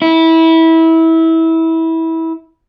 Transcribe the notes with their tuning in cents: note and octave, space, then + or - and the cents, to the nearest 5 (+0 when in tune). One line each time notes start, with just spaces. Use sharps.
E4 -20